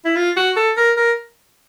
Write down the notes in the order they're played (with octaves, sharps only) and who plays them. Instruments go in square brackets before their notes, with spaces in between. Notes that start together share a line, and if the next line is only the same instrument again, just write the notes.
[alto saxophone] E4
F4
F#4
A4
A#4
A#4